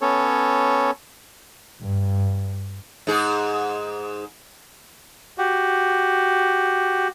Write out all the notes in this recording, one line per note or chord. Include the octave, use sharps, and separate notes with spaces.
B3 C#4 A4 C#5
G2
G#2 G#4
F#4 G4